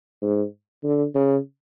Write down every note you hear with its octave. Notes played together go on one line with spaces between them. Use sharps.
G#2
D3
C#3